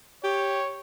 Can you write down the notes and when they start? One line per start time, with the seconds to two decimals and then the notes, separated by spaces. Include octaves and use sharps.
0.24 G4 C#5